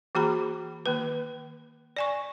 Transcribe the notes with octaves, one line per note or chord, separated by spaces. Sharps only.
E3 A#3 F#4 G#4 A#5 B5
D#3 A#3 B4
D5 G#5 C#6